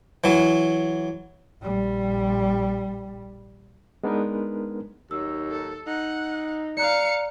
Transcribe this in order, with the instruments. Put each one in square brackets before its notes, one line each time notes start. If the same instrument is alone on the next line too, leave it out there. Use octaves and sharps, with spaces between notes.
[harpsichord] E3 F#3
[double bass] A#1 G3
[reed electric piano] G#3 B3 D4 D#4 A#4 B4
[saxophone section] D#2 F#3 D#4 [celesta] E6
[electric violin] A4
[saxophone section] D#4 [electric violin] F#5
[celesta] D5 A#5 F#6 [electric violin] F5 C#7